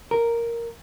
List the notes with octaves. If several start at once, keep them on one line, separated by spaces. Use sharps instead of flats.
A#4